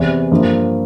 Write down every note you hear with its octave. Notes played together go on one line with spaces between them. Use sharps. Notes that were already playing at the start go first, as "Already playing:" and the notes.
Already playing: E2 C3 E3
G2 F3 A#3